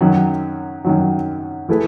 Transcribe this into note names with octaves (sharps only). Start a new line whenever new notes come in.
F#2 D#3 F#3
F#2 D#3 F#3
E3 A3 E4 G#4 B4